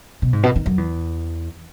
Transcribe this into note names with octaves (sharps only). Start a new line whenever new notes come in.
B2
G#2
B2
D#3
F#2
E2